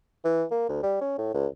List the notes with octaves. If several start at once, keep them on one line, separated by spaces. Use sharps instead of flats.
E3
A#3
D2
G3
C#4
A2
C#2